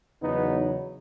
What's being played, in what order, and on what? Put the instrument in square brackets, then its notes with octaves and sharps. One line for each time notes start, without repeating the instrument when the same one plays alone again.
[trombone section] E2 C#3 F#3 B3 D#4